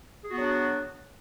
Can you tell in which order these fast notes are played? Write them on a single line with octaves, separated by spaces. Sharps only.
G#4 F#4 B3 F#3 D4